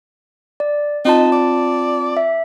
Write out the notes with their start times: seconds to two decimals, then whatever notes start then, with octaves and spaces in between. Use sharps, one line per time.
0.60 D5
1.05 C4 D#4 F4 A5
1.32 D5
2.17 E5